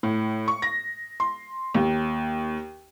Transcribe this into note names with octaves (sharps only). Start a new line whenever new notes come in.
A2
C#6
A#6
C6
D#2